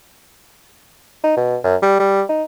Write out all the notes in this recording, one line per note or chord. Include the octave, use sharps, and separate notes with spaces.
D#4
B2
F#2
G3
G3
D#4